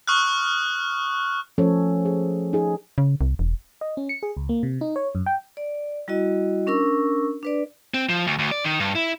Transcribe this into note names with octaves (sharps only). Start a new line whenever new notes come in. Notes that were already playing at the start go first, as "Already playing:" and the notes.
C#6 D#6 F6 F#6
F3 A3 C#4 A4 C#5
G#4
D#4 G#4
C#3
C2
E1
D#5
C#4
C#7
G#4
C#2
A#3
C3
D#4
C#5
F#2
G5
D5
G3 E4 F#4 D#5
C#4 D4 A#4 C#6 E6
D4 B4 D5
C4
F3
D2
D2
D5
D#3
G2
E4